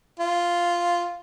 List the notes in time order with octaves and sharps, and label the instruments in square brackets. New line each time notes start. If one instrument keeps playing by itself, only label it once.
[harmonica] F4